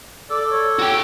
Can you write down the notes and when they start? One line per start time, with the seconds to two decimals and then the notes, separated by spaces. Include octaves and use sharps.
0.30 A4 D5
0.51 C#5
0.79 F#4 G5